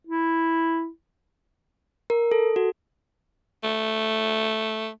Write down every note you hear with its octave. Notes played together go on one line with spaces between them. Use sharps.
E4
A#4
A4
F#4
A3